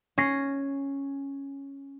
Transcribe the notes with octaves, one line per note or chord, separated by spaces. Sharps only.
C#4 A#6 C7